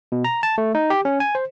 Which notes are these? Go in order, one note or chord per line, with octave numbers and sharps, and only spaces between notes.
B2
A#5
A5
A3
D#4
G4
C#4
G#5
C5